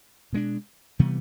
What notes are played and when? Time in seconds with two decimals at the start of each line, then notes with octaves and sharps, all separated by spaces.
0.33 B2 G#3 B3 D4
0.99 C3 E3 G3 B3